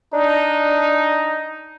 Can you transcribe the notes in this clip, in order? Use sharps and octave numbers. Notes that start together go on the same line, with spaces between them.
D4 D#4